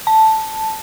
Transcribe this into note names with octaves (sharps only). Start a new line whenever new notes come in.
A5